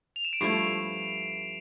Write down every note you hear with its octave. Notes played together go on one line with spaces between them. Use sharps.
F7
E7
D7
G2 F3 A3 E4 C7